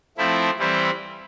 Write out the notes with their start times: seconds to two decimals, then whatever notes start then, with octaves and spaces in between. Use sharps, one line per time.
0.17 F3 A3 C4 E4
0.58 E3 G3 C4 E4